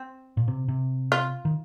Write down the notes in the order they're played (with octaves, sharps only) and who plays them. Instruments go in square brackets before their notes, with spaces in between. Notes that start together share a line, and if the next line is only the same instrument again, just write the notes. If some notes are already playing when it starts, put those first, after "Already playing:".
Already playing: [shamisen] C4
[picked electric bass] A#2
C3
C3
[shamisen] F4
[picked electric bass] D#3